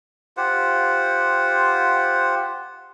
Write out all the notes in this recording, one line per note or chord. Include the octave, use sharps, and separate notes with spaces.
F4 G4 C5 F#5